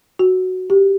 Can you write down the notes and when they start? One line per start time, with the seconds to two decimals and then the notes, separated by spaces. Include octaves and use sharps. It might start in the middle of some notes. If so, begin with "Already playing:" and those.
0.19 F#4
0.70 G4